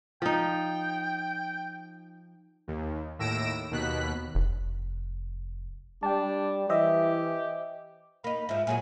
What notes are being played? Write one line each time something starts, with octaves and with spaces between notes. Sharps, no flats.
F3 D#4 G5
D#2
D#2 A2 E6 A#6 D7 E7
D#2 B2 F#6 B6
F1
G3 D4 G5 A5
E3 G4 C5 D#5 E5
A#3 D#4 B5
G#2 F3 E5
A#2 F#3 G#4 G#5